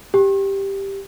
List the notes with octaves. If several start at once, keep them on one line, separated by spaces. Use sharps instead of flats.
G4